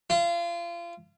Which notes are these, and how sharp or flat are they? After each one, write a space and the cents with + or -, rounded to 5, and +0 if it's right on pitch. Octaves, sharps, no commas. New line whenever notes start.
F4 -30